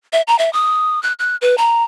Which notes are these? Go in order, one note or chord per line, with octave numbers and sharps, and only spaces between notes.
E5
A#5
E5
D#6
F#6
F#6
B4
A#5